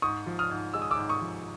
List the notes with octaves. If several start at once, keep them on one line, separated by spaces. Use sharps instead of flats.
G#2 C#6 D#6
F3
D#6 F6
G#2
G#3 E6
D#6
D6 E6
G#2
C#6 D#6
F3